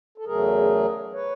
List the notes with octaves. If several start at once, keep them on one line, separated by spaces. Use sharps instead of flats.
A4
E2 C#3 F#3 A3 G#4 A#4
B4 C#5